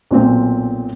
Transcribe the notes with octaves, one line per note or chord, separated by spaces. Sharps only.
B1 A#2 C4